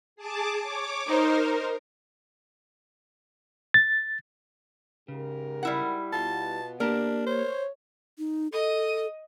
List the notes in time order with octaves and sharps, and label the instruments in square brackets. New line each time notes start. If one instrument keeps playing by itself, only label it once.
[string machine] G#4 A5 D6
C#5 D6
[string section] D#4 C5 [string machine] A#4
[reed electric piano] A6
[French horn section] G#2 G4 A#4 [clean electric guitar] C#3
[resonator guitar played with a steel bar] G3 E4 F#5
[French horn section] B2 B3 [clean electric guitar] F4 [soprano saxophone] A5
[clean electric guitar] A#3 G4 A5 [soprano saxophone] D4 [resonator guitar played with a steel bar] A#4
[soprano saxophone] C5 [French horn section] C#5
[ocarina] D#4
[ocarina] A4 [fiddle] D#5 D#6